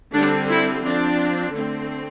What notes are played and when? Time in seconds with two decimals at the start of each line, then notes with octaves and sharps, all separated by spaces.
0.14 D3 G3 C4 D4
0.49 E4
0.83 F3 C4 D4
1.53 D3 A3 C4